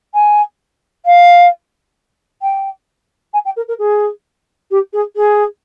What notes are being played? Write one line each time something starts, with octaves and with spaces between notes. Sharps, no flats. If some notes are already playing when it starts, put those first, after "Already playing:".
G#5
F5
G5
G#5
G5
A#4
A#4
G#4
G4
G#4
G#4